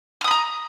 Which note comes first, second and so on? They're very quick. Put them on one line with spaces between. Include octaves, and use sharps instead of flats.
F6 D#6 B5 A#5